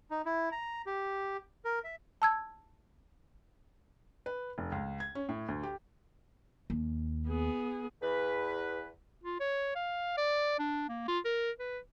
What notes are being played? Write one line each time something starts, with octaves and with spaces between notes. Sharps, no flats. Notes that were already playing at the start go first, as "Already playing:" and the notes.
D#4
E4
A#5
G4
A#4
E5
A5 E6 G#6
B4
F1
C#2
G#6
C#4
A2
D2
G4
D#2
B3 G#4
E2 B4
F4
C#5
F5
D5
D4
A#3
F4
A#4
B4